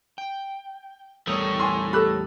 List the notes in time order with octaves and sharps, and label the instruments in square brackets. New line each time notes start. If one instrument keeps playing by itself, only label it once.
[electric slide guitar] G5
[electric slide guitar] E2 G3 A#4 [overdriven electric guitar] A3 C#5 [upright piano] D#6
[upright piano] G#5 C6
[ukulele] G4 A4 [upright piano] B5 E6 F#6